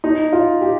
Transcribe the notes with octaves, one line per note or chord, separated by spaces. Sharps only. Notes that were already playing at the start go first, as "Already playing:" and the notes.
D#4
F4
G4